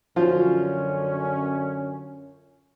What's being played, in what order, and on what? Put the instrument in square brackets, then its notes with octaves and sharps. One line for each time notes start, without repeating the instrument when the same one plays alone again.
[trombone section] F#2 D3 C#4 [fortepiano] F3 F#3 F4